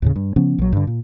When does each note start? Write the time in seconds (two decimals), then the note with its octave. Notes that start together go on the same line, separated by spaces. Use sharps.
0.02 D#2 A2 C#3
0.16 G2
0.36 C#3 F3 B3 C#4
0.58 A#1 F#3
0.72 G2 D3
0.87 A#2